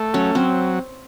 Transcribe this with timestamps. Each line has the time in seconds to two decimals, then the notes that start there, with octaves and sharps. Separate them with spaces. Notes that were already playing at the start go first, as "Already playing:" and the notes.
Already playing: A3
0.14 F#3 C#4
0.35 F#3 C4